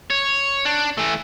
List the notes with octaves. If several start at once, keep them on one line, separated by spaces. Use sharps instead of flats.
C#5
D4
E3 A3